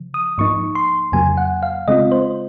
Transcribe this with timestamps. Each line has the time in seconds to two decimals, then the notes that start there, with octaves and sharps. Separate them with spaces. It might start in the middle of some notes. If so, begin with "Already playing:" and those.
Already playing: C#3 F3
0.14 D#6
0.38 G#2 F3 A#3 D#4 C#6
0.75 C6
1.12 F2 C#3 F#3 A#3 G#5
1.37 F#5
1.63 F5
1.88 C#3 G#3 C4 F4 D#5
2.12 C5